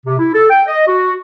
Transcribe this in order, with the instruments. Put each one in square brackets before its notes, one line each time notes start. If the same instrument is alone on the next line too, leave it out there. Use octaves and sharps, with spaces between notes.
[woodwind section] C3
E4
A4
G5
D#5
F#4